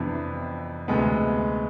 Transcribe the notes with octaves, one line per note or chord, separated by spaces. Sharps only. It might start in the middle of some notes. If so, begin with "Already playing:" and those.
Already playing: F2 C3 E3 B3 D4
D2 C3 G#3 B3